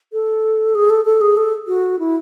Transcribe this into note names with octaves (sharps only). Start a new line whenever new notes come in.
A4
G#4
A4
A4
G#4
A4
F#4
E4